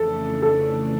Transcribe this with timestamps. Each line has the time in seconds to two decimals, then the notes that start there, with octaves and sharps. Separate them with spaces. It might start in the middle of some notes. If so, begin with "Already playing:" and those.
Already playing: F2 C#3 E3 A3 D4 A4
0.42 A4